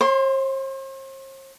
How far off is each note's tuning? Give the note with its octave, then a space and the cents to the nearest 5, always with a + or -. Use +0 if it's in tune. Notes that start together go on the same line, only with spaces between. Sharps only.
C5 +45 C6 +0